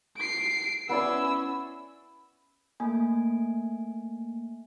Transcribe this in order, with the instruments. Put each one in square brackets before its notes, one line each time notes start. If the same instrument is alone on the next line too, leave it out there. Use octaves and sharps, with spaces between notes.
[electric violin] C7 D7
[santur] B3 E4 D5 [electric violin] C#4 E6
[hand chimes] A3 A#3 G#5